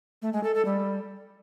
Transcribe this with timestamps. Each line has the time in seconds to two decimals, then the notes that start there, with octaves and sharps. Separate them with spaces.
0.22 A3
0.33 G#3
0.44 A4
0.54 A4
0.65 G3